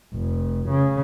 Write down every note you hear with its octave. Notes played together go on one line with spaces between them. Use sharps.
F1
C#3